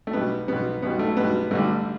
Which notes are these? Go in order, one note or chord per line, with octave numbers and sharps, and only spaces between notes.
A3
B1 B2 G3 B3
B1 B2 G3 B3
B1 B2 G3 B3
A3
B1 B2 G3 B3
A1 G2 D3 G3 A3